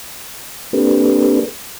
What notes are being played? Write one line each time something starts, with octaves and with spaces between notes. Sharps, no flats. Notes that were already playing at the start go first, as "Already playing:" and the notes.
A#3 C4 D4 G4 A4 B4